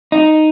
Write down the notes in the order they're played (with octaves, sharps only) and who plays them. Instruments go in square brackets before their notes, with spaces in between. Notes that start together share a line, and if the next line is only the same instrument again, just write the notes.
[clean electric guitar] D#4